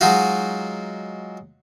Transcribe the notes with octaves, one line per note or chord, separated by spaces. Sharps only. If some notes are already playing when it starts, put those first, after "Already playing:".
F#3 G#3 D#4 F4 F#4